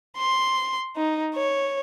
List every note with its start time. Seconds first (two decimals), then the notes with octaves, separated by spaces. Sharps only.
0.18 C6
0.96 D#4
1.35 C#5